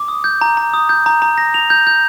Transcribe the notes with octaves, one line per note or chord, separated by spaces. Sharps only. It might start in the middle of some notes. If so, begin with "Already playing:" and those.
Already playing: D6
D#6
G6
A#5
A#5
D#6
G6
A#5
A#5
A#6
F7
G6
G6